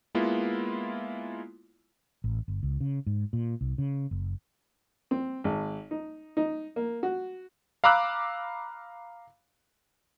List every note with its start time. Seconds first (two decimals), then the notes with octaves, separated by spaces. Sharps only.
0.15 G#3 A#3 B3 E4 F4
2.24 A1
2.48 G1
2.63 C#2
2.80 C#3
3.06 G#2
3.33 A#2
3.61 C2
3.78 C#3
4.11 F#1
5.11 C4
5.44 G#1
5.91 D#4
6.37 D#4
6.76 A#3
7.03 F#4
7.84 F5 A#5 B5 D6 E6 F#6